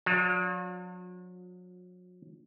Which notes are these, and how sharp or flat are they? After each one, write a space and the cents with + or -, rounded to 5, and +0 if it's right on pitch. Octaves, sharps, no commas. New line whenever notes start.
F#3 -40 D4 -40 F4 +45